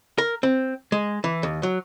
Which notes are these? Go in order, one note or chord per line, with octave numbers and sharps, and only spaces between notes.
A#4
C4
G#3
E3
D#2
F#3